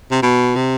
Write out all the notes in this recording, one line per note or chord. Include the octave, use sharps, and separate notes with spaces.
C3
B2
C3